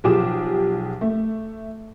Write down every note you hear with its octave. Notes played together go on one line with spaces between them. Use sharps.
B1 F3 G4 G#4 D6 E7
A3